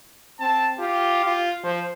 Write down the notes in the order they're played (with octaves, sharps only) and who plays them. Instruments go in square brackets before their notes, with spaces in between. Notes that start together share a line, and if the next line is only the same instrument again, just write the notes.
[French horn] C4 [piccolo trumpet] A5
[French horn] F4 [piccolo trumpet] G4
[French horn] F4
[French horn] F3 [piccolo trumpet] C5